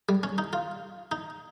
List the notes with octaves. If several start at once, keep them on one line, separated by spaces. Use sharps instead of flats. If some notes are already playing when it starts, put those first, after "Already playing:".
G3
C#4
D#4
F4
D#4